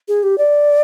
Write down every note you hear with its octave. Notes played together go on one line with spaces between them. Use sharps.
G#4
G4
D5